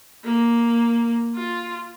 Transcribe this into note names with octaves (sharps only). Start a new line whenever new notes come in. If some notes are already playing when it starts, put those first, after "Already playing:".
A#3
F4